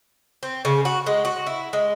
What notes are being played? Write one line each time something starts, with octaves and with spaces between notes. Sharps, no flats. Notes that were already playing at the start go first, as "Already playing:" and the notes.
C4
C#3
F#4
G#3
F#4
E4
G#3